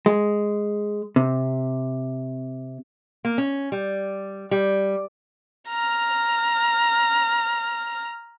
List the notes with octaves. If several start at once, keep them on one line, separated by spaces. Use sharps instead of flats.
G#3
C3
A#3
C#4
G3
G3
A#5 F6